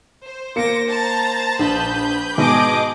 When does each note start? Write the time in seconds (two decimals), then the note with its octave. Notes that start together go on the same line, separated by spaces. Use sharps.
0.24 C5
0.56 A#3 D6 A#6 C#7
0.89 C5 A5 A#5 A6
1.59 A#1 B4 G6
2.38 G#2 B2 G#4 D#5 D6